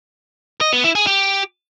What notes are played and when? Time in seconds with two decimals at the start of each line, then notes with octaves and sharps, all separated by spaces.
0.61 D#5
0.73 B3
0.84 E4
0.95 G#4
1.07 G4